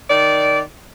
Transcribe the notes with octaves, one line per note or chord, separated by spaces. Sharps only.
D#3 D5